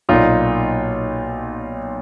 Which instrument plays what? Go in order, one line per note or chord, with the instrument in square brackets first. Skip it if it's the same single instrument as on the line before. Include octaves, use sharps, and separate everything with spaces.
[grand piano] B1 A#2 D#4 F4